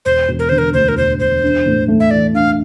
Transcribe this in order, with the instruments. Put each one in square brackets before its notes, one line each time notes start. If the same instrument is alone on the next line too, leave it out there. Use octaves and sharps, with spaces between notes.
[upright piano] E1 [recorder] C5
[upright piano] E1
[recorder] A#4
[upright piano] D3 [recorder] C5
[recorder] A#4
[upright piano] D2 [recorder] C5
[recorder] A#4
[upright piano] E1 [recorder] C5
[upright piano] E1 [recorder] C5
[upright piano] D4
A2
A3
[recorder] E5
[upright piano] E3 [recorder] D5
[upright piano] D4 [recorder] F5